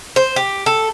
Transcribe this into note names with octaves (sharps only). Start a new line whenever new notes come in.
C5
G4
A4